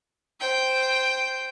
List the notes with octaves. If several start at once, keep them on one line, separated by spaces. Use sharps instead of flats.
C5 G5